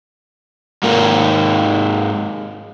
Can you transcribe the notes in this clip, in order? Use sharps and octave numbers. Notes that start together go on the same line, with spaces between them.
G#2 A#3